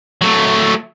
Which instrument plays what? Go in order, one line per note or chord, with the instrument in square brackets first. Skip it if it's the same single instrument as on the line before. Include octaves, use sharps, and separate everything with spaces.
[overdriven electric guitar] F#3 A3